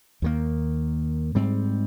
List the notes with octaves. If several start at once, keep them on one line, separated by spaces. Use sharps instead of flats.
D#2 D#3 A#3
G#2 G3 C4